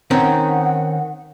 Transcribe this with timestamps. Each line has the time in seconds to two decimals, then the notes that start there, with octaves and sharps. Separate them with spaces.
0.11 D#3 C4 C#4 F#5